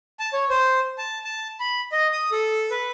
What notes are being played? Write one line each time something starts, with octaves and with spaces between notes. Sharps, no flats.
A5
C#5
C5
A5
A5
B5
D#5
D#6
A4
B4